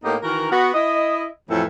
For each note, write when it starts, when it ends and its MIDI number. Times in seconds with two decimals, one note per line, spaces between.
0.03 0.15 45
0.03 0.15 58
0.03 0.15 59
0.03 0.15 63
0.03 0.15 64
0.03 0.15 67
0.22 0.49 51
0.22 0.49 52
0.22 0.49 66
0.22 0.49 70
0.51 0.73 59
0.51 0.73 66
0.74 1.26 64
0.74 1.26 75
1.50 1.63 41
1.50 1.63 45
1.50 1.63 52
1.50 1.63 54
1.50 1.63 69